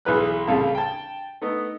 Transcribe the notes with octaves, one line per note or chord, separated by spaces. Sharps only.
B1 E3 G#4 B4 F6 F#6
C2 A2 C#3 A4 F5 A5
G5 A5
A3 B3 D#4